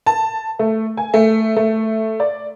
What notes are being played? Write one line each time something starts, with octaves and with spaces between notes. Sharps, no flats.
A5
A3
G#5
A3
A3
D5